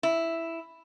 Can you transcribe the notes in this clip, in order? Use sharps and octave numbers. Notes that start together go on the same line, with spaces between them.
E4